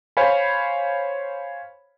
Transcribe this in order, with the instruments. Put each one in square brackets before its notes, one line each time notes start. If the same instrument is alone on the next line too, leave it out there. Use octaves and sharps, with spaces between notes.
[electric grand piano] C5 C#5 F5 G#5 B5